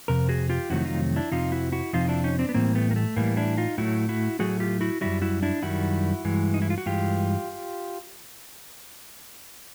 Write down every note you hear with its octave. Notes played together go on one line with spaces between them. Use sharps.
F2 C3 A#4
F#4 G#4
F4 G4
F2 C3 D#3 F#3 A3 E4 F#4
D#4 F4
D4 E4
F2 C3 F3 D#4 F4
E4 F#4
E4 F#4
F2 C3 F3 D#4 F4
D4 E4
C#4 D#4
C4 D4
B3
A2 E3 G3 A#3 C4
A3 B3
A#3
A3
A2 E3 G3 A#3
D4 E4
D#4 F4
A2 F#3 A3 E4 F#4
E4 F#4
A2 F#3 A3 F#4 G#4
F4 G4
E4 F#4
F#2 D#3 G3 E4 F#4
E4 F#4
D4 E4
F#2 D#3 G3 E4 F#4
G2 E3 G#3
D#4
E4
F4
F#4
G2 E3 G#3 F4 G4